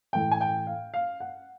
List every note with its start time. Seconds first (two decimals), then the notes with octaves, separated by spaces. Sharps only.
0.13 A2 E3 A3 G5
0.31 G#5
0.41 G5
0.67 F5
0.94 F5
1.20 F#5